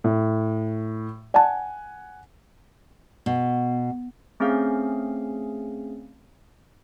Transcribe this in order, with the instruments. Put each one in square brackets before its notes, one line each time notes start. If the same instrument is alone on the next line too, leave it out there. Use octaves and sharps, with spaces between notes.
[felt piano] A2
[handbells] D5 A5 [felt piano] F#5 G#5
[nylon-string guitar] B2
[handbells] A3 C4 C#4 G#4 F5